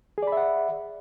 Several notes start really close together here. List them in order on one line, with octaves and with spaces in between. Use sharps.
G#4 D5 B5 E5 F#5